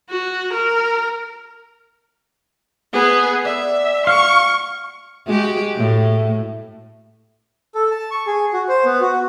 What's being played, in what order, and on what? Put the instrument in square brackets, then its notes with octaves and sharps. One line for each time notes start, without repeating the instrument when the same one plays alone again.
[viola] F#4
A#4
[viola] B3 G#4 [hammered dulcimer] F#5 G#5
[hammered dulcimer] D5 [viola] E5
[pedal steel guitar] F5 [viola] C#6
[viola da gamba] G#3 F#4 G4
A2
[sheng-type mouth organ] A4
A5
C#6
G#4
F#4
C5
B3
F#4